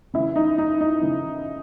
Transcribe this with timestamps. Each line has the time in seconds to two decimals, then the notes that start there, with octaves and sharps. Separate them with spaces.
0.14 C#3 E4
0.18 E3
0.36 D#4
0.58 D#4
0.81 D#4
1.01 C#3 E3